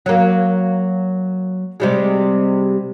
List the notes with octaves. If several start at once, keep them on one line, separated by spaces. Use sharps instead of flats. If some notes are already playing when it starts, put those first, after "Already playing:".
F#3 A#3
C3 G3 G#3